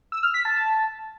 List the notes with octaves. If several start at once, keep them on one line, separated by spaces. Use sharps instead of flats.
E6
F6
B6
A5
A5